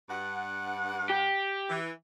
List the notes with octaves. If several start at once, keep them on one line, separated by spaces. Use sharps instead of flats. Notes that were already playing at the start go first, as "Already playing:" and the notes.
G2 F#5
G4
E3